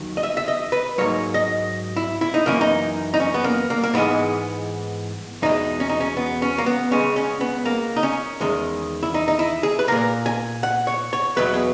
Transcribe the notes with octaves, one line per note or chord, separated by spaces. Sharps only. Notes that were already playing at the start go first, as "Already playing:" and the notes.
Already playing: D#2 D#3 F#3
D#5
E5
E5
D#5
B4
G#2 F#3 A#3 C#5
D#5
E4
E4
D#4
F#2 E3 A#3 C#4
D#4
D#4
C#4
B3
A#3
A#3
A#3
G#2 E3 G#3 B3
E2 B2 G#3 D#4
C#4
D#4
C#4
B3
C#4
A#3
B3
C#2 C#3 G#3 C#4
C#4
B3
A#3
D#4
C#4
E2 D#3 G#3
E4
D#4
D#4
E4
G#4
B4
A#2 A#3 A#4
G#5
F#5
C#5
C#5
E2 B2 F#3 B4
G#4